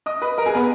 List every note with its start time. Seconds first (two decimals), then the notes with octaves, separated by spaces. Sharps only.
0.06 D#5 D#6
0.22 B4 B5
0.38 A#4 A#5
0.46 G#4 G#5
0.55 B3 B4